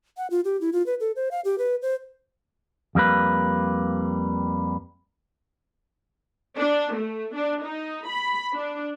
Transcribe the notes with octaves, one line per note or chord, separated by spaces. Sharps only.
F#5
F4
G4
E4
F4
B4
A4
C5
F5
G4
B4
C5
F2 G3 A#3 B4
D4
A3
D4
D#4
B5
D4